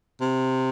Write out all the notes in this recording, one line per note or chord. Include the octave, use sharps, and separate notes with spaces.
C3